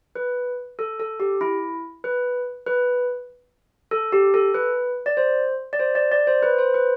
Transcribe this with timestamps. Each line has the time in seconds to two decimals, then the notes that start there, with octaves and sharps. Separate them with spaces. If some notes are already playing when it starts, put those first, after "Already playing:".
0.16 B4
0.79 A4
1.00 A4
1.20 G4
1.41 E4
2.04 B4
2.66 B4
3.91 A4
4.12 G4
4.34 A4
4.54 B4
5.06 D5
5.17 C5
5.73 D5
5.80 C5
5.95 D5
6.12 D5
6.27 C5
6.43 B4
6.58 C5
6.74 B4